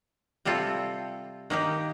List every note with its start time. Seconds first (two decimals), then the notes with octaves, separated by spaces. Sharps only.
0.45 C3 G3 C4 F4 A4
1.50 D#3 A#3 D#4 G4